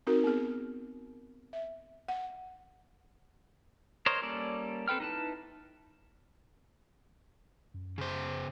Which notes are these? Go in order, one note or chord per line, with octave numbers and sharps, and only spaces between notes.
C4 D#4 F#4 A#4
B3 G#4
E5
F#5
A#4 C5 C#5 D#5
G3 A#3 C#4 A4 D5
C4 A4 B4 G5 F6
D#4 E4 B4 A5
F#2
C#3 C5